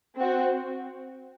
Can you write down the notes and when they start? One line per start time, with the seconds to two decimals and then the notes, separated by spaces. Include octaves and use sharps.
0.16 C4 F#4